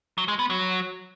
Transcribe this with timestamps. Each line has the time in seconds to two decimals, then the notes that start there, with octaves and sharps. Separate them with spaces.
0.18 F#3
0.28 G#3
0.39 B3
0.50 F#3